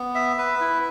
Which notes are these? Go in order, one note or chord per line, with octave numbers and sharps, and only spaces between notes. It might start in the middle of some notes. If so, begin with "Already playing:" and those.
Already playing: B3
E5
B4
E4